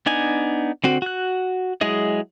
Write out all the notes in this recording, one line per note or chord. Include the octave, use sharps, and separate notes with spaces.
B3 D4 D#4 G#5
D3 C4 F#4
F#4 F#6
F#3 G#3 E4 G#4 D#5